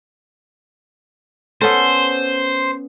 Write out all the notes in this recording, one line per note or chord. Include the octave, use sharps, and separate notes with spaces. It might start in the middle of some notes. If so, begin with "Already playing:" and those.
B3 C#4 A4 C5